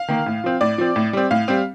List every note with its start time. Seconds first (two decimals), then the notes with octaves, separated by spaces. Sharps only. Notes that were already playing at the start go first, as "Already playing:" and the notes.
Already playing: F5
0.08 D#3 A#3
0.26 A2
0.44 F3 C4
0.61 A2 D5
0.78 F3 C4
0.96 A2
1.13 G3 C4
1.31 A2 F5
1.48 G3 C4